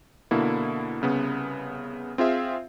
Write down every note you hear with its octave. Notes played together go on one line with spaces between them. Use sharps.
B2 D3 A#3 E4
C2 C#3 B3
C4 F4 G#4 E5 F5